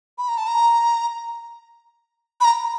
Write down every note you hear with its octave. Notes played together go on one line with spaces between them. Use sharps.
B5
A#5
A5
A#5
B5
A#5